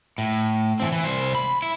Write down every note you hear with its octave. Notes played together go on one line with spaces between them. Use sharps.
A2
E3 C4
E3
C2 C5
B5
E4